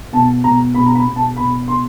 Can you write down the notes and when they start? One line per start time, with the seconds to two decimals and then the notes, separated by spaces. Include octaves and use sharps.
0.13 B2 A5
0.44 B2 A#5
0.74 B2 B5
0.86 A#5
0.95 B5
1.06 B2
1.16 A5
1.37 B2 B5
1.68 B2 C6